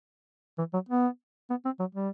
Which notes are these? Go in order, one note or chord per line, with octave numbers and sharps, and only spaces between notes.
E3
F#3
B3
B3
C4
F#3
G3